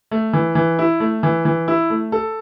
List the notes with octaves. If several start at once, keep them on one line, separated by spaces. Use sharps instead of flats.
A3
E3
E3
E4
A3
E3
E3
E4
A3
A4